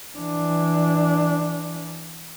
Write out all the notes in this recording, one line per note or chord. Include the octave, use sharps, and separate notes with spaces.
E3 D4